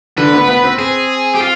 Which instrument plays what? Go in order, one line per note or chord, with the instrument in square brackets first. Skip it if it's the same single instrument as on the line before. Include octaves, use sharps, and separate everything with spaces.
[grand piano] D3 [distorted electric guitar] B4
[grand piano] B3
B3
C4
[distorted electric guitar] G#4
G4
F4